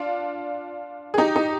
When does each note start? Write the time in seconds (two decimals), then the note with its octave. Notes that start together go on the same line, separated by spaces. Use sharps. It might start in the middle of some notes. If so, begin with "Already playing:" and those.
Already playing: D4 F4
1.14 G#4
1.18 D#4 G4
1.36 D#4 G4